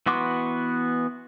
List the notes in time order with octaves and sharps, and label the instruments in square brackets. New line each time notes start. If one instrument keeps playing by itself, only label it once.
[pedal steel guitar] E3 B3 F#4 C6 D6